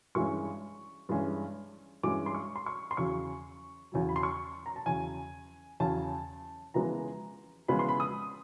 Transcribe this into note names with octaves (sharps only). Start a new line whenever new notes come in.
G2 E3 G#3 C#4 C#6
G2 E3 G#3 C#4
G2 E3 G#3 C#4 D6
C6
C#6
C6
C#6
C6
E2 C#3 F#3 C#6
E2 C#3 F#3
B5
C6
C#6
A#5
A5
E2 C#3 F#3 G#5
E2 C#3 F#3 A5
F2 C#3 E3 G#3 B3 A#5
F2 C#3 E3 G#3 B3 B5
C6
B5
D#6